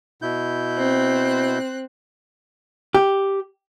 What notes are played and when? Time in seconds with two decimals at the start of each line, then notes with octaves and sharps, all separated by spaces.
0.22 B2 E4 G6
0.74 C4 F#6
2.95 G4